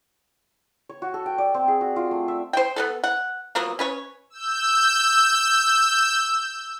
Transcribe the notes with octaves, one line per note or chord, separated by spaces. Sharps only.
C#5
F#4
A4
G5
D5
C4
G#4
F#4
F4
A3
E5
C5 G5
B3 C4 A4
F#5
F3 F#3 A#3 B3
C#4 B4 C#5
E6 G6